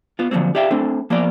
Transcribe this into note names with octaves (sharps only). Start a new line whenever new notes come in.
B3 F4
D3 F3 F#3 A#3 C4
G4 D5 E5 F5 G5
A3 C4 D4 A4
F3 A#3 B3 A#4 D5